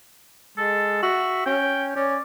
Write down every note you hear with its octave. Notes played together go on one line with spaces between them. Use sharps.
G#3 A4
F#4 E5
C#4 G5
C#4 D5